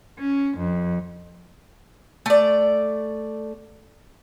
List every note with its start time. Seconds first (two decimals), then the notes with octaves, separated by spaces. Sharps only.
0.19 C#4
0.58 F2
2.26 A3 D5